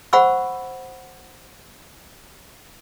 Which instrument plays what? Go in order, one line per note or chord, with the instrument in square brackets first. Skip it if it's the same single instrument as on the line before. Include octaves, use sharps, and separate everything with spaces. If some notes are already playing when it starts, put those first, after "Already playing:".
[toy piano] C5 F#5 B5 C#6 E6